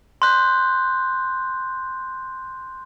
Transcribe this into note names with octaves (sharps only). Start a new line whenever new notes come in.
C6 F#6 G6